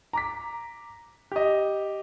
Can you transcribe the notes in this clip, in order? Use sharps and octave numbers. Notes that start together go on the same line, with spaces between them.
A#5 D6 B6
G4 D#5